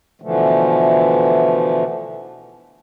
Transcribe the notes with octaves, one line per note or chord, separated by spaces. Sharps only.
B2 D3 E3 F3 A3